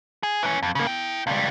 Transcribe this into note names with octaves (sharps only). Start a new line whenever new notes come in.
G#4
E3 C#4
F2
C#3 A#3
E4 G5
C#2 G3